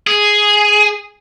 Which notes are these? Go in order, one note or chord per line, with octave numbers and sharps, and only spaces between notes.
G#4